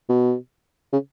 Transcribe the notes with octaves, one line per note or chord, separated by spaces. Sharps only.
B2
C#3